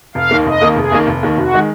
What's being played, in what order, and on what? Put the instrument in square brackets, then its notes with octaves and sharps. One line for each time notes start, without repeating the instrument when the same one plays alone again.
[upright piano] F1 [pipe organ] F5
[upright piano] D#2 D#3 A#3
[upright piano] F1 [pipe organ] D#5
[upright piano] D#2 D#3 A#3
[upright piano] F1 [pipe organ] G#4
[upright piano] D#2 D#3 A#3
F1
D#2 D#3 A#3
[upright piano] F1 [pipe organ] F#4
[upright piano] D#3 G#3